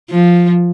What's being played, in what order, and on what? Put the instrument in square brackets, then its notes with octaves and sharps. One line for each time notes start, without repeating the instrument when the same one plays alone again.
[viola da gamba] F3